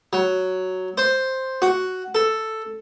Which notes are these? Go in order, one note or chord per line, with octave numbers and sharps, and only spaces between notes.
F#3
C5
F#4
A4